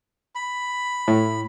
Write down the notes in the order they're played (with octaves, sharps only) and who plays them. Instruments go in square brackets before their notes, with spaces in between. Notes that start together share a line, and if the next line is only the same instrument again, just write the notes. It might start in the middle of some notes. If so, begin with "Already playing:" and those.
[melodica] B5
[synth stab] A2